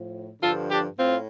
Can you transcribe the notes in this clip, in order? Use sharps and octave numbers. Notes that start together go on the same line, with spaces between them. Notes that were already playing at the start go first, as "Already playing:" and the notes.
Already playing: A2 F3
G2 D3 F3 F4 A4
D4 G4
A2 C4 F4